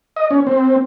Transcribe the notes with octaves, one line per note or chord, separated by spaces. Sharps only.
D#5
C#4
C4